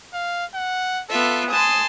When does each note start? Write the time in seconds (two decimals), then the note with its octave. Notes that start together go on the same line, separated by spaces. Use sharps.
0.14 F5
0.54 F#5
1.10 B3 F4 A4 E5
1.50 G#5 A5 C6 D#6